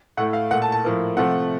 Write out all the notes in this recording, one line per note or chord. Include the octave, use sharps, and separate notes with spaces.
A2 A3 F#5
F5
A#2 A3 F#5
A5
A5
A2 F3 A#3
C3 F3 A3 F#5